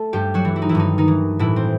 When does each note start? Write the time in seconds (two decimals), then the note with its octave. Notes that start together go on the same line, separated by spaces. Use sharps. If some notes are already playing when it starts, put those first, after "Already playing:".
Already playing: A3 A4
0.13 G2 G3 G4
0.34 F#3 F#4
0.45 E3
0.56 E4
0.62 D#4
0.69 E3 E4
0.75 G2 D#3 D#4
0.98 D#3 D#4
1.08 E3
1.39 A2 E3 E4
1.56 C4